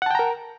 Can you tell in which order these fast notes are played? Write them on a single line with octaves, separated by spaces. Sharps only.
F#5 A5 G5 A#5 A#4